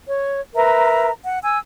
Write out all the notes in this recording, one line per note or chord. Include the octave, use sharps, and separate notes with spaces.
C#5
A#4 B4 E5 A#5
F#5
G#5 E6